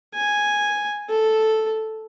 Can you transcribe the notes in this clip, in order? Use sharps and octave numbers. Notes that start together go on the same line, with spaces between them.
G#5
A4